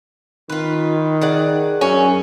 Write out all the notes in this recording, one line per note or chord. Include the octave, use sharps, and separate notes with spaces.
D#3 F4 B4
G#4 D5 F#5
F#2 C#4